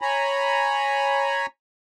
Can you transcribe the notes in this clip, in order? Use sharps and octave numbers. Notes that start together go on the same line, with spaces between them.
C#5 G#5 A#5 B5